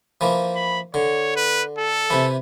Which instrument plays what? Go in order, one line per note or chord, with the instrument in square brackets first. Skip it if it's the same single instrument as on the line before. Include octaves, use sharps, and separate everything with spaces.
[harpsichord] E3 F3 A#3
[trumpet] B5
[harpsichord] D3 [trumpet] C#5
[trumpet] B4
A4
[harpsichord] C3 E3